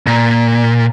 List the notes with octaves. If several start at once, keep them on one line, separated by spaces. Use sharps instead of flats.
A#2